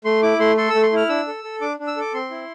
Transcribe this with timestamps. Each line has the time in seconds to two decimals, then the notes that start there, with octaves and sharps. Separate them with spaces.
0.05 A3 C6
0.22 E4 D6
0.39 A3 C6
0.57 A4 C6
0.70 A3 E6
0.83 C6
0.92 E4 F6
1.09 D4 E6
1.27 A4
1.44 A4
1.61 D4 D6
1.79 D4
1.87 E6
1.97 A4 D6
2.14 C4 C6
2.31 E4